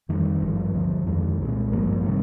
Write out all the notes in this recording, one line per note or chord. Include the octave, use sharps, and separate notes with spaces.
F2 D#3 G3
G#1 G2 F3
D2 D3 F3
F2 D#3 G#3
C2 A#2 G#3
G#1 G2 F3 A#3
C3 D#3 G3